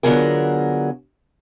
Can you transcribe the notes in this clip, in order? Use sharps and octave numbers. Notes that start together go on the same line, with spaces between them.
D3 F#3 B3 F4 G#4 A#4